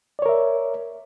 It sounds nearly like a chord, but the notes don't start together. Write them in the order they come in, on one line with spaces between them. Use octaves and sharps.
D5 C#5 A#4 E5